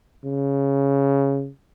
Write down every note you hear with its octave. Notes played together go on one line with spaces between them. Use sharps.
C#3